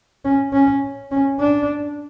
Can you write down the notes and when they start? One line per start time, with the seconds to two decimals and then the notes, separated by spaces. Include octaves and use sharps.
0.25 C#4
0.53 C#4
1.11 C#4
1.40 D4